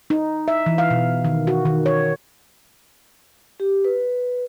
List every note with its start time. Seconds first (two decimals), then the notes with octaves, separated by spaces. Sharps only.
0.10 D#4
0.48 E5
0.66 E3
0.78 F5
0.90 B2
1.25 D#3
1.47 F#4
1.65 D#3
1.86 C#5
3.60 G4
3.85 B4